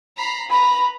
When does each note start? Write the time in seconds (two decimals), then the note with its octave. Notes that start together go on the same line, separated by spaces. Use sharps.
0.17 A#5 B5 C7
0.50 B4 A#5 B5